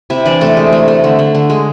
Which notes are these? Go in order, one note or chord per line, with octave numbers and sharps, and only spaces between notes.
C3 E4 E5
E3 D4 D5
C3 A3 A4
G#3
A3
A3
D3
D3
D3
G#3